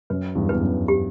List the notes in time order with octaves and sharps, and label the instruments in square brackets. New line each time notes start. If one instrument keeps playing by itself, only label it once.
[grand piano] F#2 [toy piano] B4
[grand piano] E2 G2
[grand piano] E2 [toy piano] B4
[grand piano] F#2
[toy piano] G4